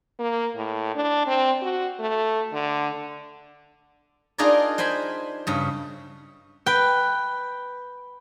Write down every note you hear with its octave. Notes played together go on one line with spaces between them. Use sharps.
A#3
A2
D4
C4
F#4
A3
D3
D4 D#4 F4 G#4 A#4 D5
C5 G5 G#5 B5
G2 C#3
B4 G5